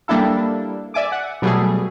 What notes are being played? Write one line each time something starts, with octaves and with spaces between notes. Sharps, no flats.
G3 A#3 D4 E4 A4
D5 E5 G#5 D6
F#5
B2 F#3 G3 A3 G#4